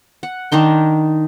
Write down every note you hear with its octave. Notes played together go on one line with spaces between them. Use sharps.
F#5
D#3 D4 D#4 C6